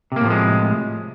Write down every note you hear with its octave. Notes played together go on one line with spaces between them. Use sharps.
A2 C3 F3 G#3 A#3